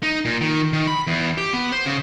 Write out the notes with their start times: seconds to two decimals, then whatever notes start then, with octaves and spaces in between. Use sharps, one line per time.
0.03 D#4
0.25 A#2
0.41 D#3
0.73 D#3
0.87 B5
1.07 E2
1.38 G4
1.53 B3
1.72 C5
1.86 C#3